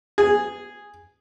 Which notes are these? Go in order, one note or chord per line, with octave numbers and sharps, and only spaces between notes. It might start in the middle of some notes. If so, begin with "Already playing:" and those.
G#4